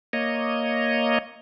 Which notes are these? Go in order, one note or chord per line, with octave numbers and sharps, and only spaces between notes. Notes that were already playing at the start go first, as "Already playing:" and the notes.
A#3 C#5 D#5